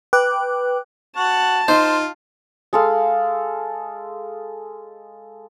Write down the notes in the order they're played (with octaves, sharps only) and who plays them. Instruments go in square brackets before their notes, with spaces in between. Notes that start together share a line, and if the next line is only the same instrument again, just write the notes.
[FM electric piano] B4 G5 D6 F#6
[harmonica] F#4 F#5 C#6 [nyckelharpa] A5
[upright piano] D#4 [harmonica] F4 [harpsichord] C5
[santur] G#3 A4 F5